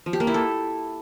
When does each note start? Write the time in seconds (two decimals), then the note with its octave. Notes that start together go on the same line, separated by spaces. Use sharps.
0.06 F3
0.13 G4
0.20 A#3
0.27 E4
0.34 A4